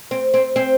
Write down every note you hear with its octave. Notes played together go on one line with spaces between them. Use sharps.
C4
C4
C4